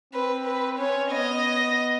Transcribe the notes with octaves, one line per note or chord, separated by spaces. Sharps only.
C4 B4
B4
C#4 C#5
B3 D#5